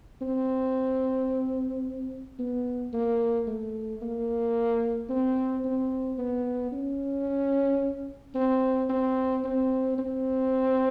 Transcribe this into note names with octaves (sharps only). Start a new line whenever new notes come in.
C4
B3
A#3
A3
A#3
C4
C4
B3
C#4
C4
C4
C4
C4